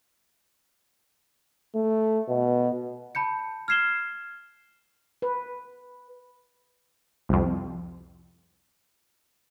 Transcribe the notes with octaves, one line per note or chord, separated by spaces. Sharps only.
A3
B2
A5 B5 G6 C#7
F6 G#6 C7 E7 G7
B4
C2 F2